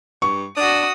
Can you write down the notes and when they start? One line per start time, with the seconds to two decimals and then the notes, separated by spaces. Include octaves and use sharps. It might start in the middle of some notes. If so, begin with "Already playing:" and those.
0.22 G2 C#6
0.57 D4 F#4 D#6